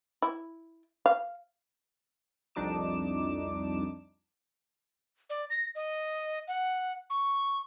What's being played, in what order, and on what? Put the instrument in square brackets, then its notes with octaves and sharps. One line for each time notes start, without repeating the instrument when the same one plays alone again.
[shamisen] E4
F5
[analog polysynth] C2 F2 D4 D#4 D6 E7
[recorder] D5
A#6
D#5
F#5
C#6